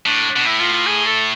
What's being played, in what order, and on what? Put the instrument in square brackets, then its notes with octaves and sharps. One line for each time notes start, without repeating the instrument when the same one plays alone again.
[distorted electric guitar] A2 [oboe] D4
[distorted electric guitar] B2
[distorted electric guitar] A2 [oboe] E4
[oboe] F4
F4
G#4
A4